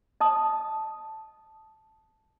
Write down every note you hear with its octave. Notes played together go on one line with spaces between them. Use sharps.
D#5 A5 D#6